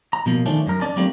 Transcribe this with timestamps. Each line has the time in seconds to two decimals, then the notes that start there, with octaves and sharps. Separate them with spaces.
0.13 A#5
0.26 B2 F3 A#3
0.46 D#3 F3 A3 C#4 D4
0.67 F#2 A#4
0.81 C#4 D5 A5
0.96 F#3 G3 A3 A#3 C4 D4